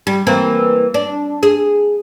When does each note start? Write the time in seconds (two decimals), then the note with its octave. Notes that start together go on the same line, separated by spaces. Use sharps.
0.07 G3
0.27 E3 A#3 C4
0.94 D4
1.43 G#4